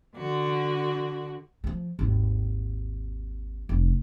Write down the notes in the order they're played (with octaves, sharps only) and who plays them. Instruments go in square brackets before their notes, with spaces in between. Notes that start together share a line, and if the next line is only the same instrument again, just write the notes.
[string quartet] D3 F#4
[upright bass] F3 F#3
G#1 D#2
F1